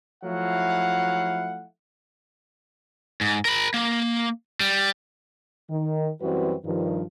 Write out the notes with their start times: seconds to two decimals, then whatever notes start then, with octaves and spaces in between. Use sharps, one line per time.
0.24 F3 F#3 A3 E4 F5 F#5
3.21 G#2
3.45 A#4 B5
3.74 A#3
4.60 G3
5.69 D#3
6.21 F#2 E3 G3 C4 F#4 B4
6.65 G2 D#3 F3